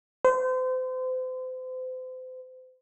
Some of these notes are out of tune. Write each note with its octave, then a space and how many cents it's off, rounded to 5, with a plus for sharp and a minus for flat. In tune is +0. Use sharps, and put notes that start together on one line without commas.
C5 -35